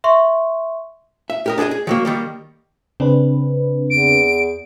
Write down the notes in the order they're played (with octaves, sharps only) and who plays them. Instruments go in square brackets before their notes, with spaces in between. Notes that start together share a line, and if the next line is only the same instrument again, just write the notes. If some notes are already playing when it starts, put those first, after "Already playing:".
[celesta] E5 C6 C#6
[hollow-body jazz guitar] E5
G4 A#4 D#5
D4 G#4 A4 D#5 G#5
G#4
D#3 F#3 A#3
D#3 G3 A#3
[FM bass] C#3 [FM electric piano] C4 D4 B4
[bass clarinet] E2 [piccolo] D7